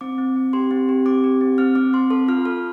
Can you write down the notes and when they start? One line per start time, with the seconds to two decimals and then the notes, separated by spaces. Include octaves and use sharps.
0.01 C4 D6
0.18 C4
0.36 C4
0.53 G4 C6
0.71 C4
0.89 G4
1.06 C4 D6
1.24 G4
1.41 C4
1.58 C4 F6
1.75 C4 D6
1.93 C4 C6
2.10 A4 C6
2.28 F4 F6
2.45 A4 F6